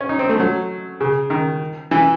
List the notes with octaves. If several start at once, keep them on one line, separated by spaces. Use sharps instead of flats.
C#4
D#4
C4
A3
F#3
C#3
D#3
E3